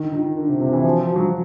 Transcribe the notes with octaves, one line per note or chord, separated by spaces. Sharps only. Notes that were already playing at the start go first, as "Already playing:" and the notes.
Already playing: D#3 D4
D#3 F4
D3 A#4
C3
C3 F4
E3
F3 F#4
F3
F#4
F#3